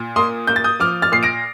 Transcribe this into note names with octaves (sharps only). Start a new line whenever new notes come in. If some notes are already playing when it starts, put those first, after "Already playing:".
Already playing: A#2
A#3 C6 D#6
A#3 G6
A6
D#6 G6
F3 D6 F6
F6 A6
A#2 C7
A#6 D7